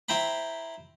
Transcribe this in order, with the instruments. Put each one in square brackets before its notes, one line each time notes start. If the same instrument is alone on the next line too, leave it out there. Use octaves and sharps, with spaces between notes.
[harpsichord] E4 C5 G5 A#5 B5